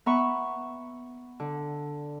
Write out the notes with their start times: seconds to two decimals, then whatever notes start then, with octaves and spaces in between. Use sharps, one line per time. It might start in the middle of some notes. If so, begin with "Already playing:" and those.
0.06 B3 E5 A#5 B5 C#6
1.40 D3